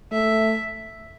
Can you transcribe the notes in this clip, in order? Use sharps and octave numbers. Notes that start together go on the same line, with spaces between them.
A3 E5